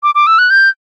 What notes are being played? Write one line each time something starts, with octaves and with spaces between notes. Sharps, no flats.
D6
D6
E6
F#6
G6